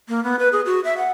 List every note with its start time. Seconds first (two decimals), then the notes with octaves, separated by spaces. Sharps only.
0.09 A#3
0.24 B3
0.39 B4
0.52 G#4
0.66 F#4
0.85 E5
0.97 F#5